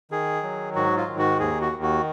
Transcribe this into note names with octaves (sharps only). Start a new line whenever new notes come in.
D#3 G#4
F#3
G#2 F#4
F4
D#3
F#4
D#2 G#4
F#4
D#3
F#4